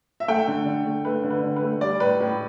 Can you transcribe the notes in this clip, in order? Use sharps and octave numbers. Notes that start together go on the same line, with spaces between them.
E5
A3 G5
D3
D3
A3
A3 B4
D3
B4
D3
B4
A3
G3 D5
A2 B4
A2